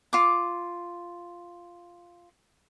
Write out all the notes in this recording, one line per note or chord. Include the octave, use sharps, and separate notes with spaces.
F4 D6